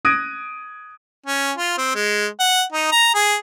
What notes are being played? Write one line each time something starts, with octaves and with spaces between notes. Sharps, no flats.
D#6 F#6 G#6 A#6 D7 D#7
C#4
F4
C4
G#3
F#5
D#4
A#5
G#4